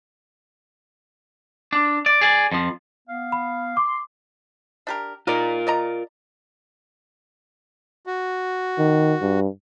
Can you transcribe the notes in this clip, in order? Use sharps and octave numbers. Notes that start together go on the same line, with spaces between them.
D4
D5
G#4 D5
F2 F3
B3 F5
B5
C6 D6
D4 G4 A#4
G#3 D#4 F4 A#4 D5
D5 D#5 A#5
F#4
D#3
G2